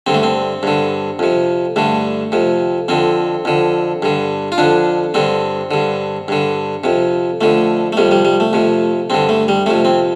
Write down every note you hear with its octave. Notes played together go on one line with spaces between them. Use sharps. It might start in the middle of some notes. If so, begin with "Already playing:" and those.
G2 D3 C4
A3
C4
G2 D3
F2 C3
G2 D3 A3
F2 C3
F2 D3 C4
F2 D3
G2 D3
F4
F2 D3 D4
G2 D3 C4
G2 D3
G2 D3
F2 C3
F2 D3 A3
A3
F2 C3 G3
G3
G3
A3
F2 C3
G2 D3 C4
A3
G3
F2 C3 A3
C4